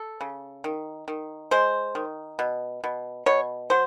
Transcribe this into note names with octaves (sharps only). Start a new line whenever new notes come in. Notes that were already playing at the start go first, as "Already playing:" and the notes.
Already playing: A4
C#3
D#3
D#3
G#3 C5
D#3
B2
B2
B2 C#5
F#3 C5